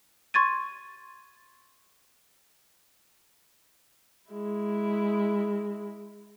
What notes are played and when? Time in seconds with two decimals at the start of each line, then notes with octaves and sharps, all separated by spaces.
0.34 C6 C#6 G#6 A6 D#7
4.30 G#3 E4